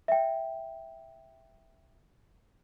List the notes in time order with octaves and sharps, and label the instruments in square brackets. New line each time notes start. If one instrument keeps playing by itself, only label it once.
[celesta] E5 G5